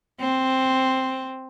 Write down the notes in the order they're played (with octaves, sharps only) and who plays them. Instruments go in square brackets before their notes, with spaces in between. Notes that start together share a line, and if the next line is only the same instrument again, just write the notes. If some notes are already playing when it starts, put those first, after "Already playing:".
[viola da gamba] C4